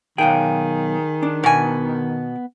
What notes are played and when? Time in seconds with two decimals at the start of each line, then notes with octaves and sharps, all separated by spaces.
0.18 B1 D#3 G#4 F5 G5 G#5
1.23 D4
1.44 B2 B3 G#5